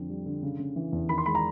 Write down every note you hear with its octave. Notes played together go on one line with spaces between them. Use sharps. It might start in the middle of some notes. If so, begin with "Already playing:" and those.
Already playing: F2 D3
G3
D3
C#3
C#3
E3
E2
D#3 B5
C6
G#3 B5
A#5